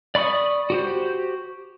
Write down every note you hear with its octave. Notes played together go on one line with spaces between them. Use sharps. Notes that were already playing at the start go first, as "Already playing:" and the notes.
D5 B5 C#6 D#6
F#4 G4 C5